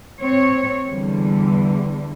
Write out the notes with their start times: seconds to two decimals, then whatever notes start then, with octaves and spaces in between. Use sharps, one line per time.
0.20 C4 C#5
0.90 E2 D3 G3